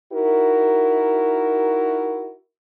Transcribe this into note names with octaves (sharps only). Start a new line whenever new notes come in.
D#4 E4 F#4 A#4